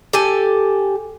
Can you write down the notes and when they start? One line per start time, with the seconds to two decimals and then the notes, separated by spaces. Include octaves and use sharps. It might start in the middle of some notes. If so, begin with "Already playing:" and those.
0.13 G4 A4 G#5